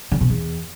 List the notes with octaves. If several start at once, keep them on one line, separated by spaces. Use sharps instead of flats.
D3
B2
E2